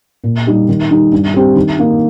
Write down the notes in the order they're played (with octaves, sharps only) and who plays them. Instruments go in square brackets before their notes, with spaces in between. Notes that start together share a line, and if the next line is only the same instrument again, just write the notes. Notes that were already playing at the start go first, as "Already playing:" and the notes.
[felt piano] A#2
G3 D#4 G4
D#3
G3 D#4
G2
G3 C4 G4
D#3
A#3 D#4